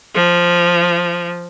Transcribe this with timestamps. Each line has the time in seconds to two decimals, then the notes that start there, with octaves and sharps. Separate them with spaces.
0.15 F3